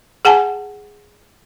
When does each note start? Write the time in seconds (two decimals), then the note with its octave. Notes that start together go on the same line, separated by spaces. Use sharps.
0.25 G#4 F#5 G#5 A5